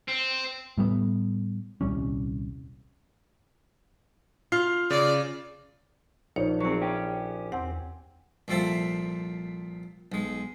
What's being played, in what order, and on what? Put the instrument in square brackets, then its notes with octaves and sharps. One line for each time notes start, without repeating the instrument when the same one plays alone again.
[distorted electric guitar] C4
[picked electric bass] A2 G3 A3 B3
D#1 C2 G3 C#4
[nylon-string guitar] F4 [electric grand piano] F6 C7
[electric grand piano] C#3 A6 [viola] D5
[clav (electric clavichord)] A#1 [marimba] D#4 C#5
[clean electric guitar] F#3 C4 [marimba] G#4 C#6
[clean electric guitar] C#4 G4
[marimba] E2 F#5 [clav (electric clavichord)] C4
[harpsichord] C2 A#2 F3 C4 A4 E5
B1 G#3